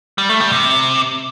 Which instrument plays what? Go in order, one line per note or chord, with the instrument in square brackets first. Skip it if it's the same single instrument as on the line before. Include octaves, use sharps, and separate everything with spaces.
[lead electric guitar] G3
A3
G3
C3